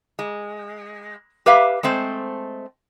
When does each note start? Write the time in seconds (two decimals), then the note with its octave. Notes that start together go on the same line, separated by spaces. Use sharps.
0.19 G#3
1.46 G4 B4 E5 F5
1.83 G#3 A3 C4 C5